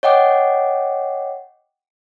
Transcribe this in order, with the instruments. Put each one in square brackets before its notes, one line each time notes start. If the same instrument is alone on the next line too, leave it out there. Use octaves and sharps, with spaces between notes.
[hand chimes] C#5 D#5 F#5 G5 D6